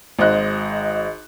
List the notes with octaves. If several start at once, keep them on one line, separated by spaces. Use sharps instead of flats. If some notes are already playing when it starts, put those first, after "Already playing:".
G#1 C5 D#5 F#6